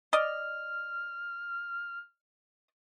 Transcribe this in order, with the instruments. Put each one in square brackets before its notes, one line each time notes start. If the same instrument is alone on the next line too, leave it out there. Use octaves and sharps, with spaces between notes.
[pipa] D5 D#5 [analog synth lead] F6